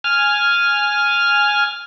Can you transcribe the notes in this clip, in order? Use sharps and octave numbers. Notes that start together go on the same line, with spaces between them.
G#5 F6